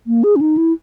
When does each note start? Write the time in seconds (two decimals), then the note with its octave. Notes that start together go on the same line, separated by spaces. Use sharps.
0.07 A#3
0.23 G#4
0.36 C#4
0.41 D#4
0.57 E4